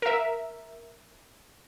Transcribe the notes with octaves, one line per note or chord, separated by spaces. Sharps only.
A#4 E5